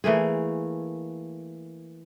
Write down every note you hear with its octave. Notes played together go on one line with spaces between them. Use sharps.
E3 A3 A#3 G#4